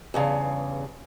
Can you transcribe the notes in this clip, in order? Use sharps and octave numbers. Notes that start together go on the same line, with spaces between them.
E2 G2 C#3